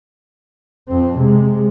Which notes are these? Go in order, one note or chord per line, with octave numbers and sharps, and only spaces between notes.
F2 C4
C3 G#3